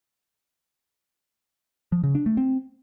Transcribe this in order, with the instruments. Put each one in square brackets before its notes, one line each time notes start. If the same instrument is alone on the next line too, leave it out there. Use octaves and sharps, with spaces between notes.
[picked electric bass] F3
C#3
D4
A3
C4